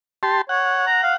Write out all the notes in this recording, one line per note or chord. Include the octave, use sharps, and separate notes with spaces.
G4 A5 C6
C#5 F#5
A#5
F5